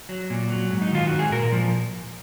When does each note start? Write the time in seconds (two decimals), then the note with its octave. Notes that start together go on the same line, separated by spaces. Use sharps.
0.09 F#3
0.30 A#2
0.50 F#3
0.70 G#2
0.82 D#4
0.91 D#3 F4
1.07 G#2 F#4
1.19 G#4
1.32 A#2 A#4
1.52 F3